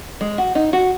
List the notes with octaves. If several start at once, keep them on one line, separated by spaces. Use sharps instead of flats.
G#3
F#4
D#4
F#4